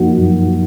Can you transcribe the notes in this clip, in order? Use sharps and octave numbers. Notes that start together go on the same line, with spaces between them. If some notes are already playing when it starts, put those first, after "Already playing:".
Already playing: F#2 F3 A#3 D#4 F#4
F#2